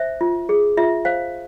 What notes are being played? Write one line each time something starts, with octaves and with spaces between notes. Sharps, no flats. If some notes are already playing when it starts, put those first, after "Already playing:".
Already playing: C5 E5
F4
G#4
F4 E5
C5 F5